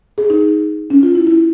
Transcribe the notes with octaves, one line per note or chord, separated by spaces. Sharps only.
G#4
D#4
C#4
F4
E4
E4